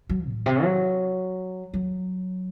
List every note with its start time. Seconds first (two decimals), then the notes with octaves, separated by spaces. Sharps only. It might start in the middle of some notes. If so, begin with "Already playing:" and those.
0.09 F#3
0.27 A2
0.46 C3
0.63 F#3
1.74 F#3